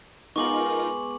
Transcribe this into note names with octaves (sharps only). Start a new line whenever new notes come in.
G#3 B3 D#4 F4 A#4 C#6 D6 F#7